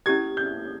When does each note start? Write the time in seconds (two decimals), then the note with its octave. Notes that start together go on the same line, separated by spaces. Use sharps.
0.06 C#4 E4 G4 G#6
0.37 G6